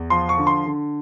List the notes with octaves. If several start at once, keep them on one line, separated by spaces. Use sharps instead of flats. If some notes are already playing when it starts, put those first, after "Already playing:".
Already playing: E2
F3 C6
C#6
D3
C6
D3